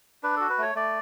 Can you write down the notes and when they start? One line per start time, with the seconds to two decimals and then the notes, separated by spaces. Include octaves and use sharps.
0.23 D4 B4
0.37 F#4 A4
0.50 B4
0.58 A3 C#5
0.75 A3 D5